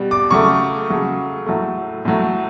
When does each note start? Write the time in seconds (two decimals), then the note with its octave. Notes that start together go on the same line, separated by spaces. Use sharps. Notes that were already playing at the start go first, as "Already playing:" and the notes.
Already playing: B2 G3
0.11 D6
0.31 C#3 F#3 A3 C#6
0.89 C#3 F#3 A3
1.46 A2 F#3 A3
2.05 A2 F#3 A3